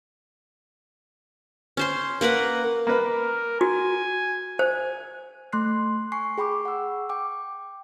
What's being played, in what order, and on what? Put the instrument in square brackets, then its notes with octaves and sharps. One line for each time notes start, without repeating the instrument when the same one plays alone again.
[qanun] C#4 C5 C6
A#3 A#4 B4 F#5
[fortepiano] A#3 B4 [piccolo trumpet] A#4
[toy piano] F#4 [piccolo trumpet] G#5
[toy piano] C5 [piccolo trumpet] G#5
[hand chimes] A3 C6 F#6 C7
G#5 C#6 C7
G#4 G5 B5 C#6 D6
F#5 E6
G5 D6